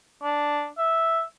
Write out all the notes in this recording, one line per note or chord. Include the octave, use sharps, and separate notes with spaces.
D4
E5